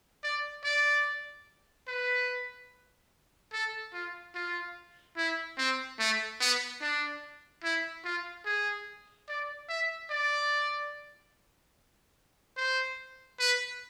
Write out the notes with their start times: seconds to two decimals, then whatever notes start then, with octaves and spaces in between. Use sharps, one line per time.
0.23 D5
0.64 D5
1.88 B4
3.53 A4
3.93 F4
4.35 F4
5.17 E4
5.58 C4
5.99 A3
6.40 B3
6.81 D4
7.64 E4
8.04 F4
8.45 G#4
9.28 D5
9.69 E5
10.10 D5
12.56 C5
13.39 B4